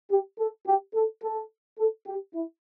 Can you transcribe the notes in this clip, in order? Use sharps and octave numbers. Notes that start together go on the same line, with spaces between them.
G4
A4
G4
A4
A4
A4
G4
E4